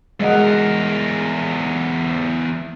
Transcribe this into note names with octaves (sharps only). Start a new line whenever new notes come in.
E2 G#3 A#4 D#5 F#5